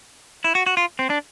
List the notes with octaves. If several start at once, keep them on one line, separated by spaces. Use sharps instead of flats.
E4
F#4
F#4
F4
C4
D4